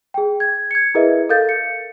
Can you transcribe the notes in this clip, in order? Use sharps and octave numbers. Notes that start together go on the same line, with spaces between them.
G#4 G5
G#6
G#6 C#7
E4 G#4 A#4 B4 D#5 E5
A4 A#4 F5 G6 A6
C#7